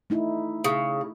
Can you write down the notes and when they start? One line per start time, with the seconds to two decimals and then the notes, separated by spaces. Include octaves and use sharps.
0.10 A3 D#4 E4
0.64 C#3